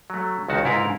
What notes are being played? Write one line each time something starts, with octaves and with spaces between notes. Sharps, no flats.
F#3 A3
C#2 D#3 F#4 A5
G#2 E4 F4 A#4 B4 F5